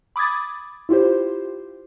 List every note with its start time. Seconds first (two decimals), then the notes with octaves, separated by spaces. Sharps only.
0.16 B5 D6 D#6 G#6 A6
0.89 E4 F4 G4 C5